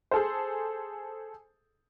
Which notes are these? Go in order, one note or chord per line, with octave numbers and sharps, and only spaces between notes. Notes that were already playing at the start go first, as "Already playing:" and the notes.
G#4 A4 C5